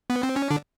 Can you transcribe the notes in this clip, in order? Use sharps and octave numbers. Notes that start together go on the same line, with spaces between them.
B3
C4
C#4
D3 D4